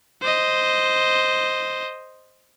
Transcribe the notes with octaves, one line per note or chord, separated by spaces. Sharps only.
C5 D#5